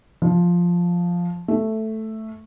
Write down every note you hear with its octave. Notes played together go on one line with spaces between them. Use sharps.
F3
A3